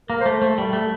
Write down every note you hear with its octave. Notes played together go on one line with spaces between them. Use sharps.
A#3 A#4
C5
A3
A3
G3
A3